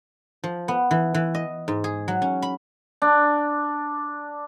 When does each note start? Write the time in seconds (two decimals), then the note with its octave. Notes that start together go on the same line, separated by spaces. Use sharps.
0.44 F3
0.68 B3
0.91 E3
1.14 E3
1.34 D#5
1.68 G#2
1.84 G#4
2.08 F#3
2.22 C#4
2.42 B5
3.02 D4